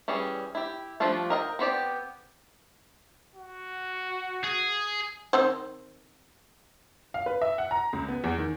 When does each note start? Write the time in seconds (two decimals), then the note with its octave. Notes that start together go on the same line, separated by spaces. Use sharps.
0.08 E3 G3 C#4 G#4
0.55 E4 G4
1.00 F3 G3 A3 D4 F4
1.30 A#4 D#5 F5 G5
1.59 B3 C4 G4 D5
3.35 F#4
4.44 G#4
5.33 D#3 C4 C5
7.14 F5
7.26 B4
7.41 E5
7.58 F#5
7.71 A#5
7.93 C#2
8.08 B3
8.24 E2
8.38 D#3